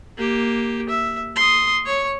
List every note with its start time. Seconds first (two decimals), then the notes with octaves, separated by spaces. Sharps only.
0.17 A#3 G4
0.89 E5
1.36 C6 D#6
1.86 C#5 C#6